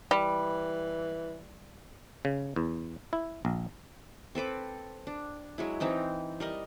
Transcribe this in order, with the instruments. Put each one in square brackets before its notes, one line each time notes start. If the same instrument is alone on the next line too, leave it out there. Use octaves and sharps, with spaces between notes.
[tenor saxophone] E3 [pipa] G3
[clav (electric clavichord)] C#3
E2
E4
A#1
[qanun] C4 A4 B4 D6
D4
F#3 G#3 E4
E3 C4 D#4 G5
G3 A#4 D#5